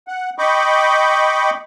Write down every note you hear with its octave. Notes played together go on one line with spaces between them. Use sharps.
F#5
D#5 G5 B5 C#6 D6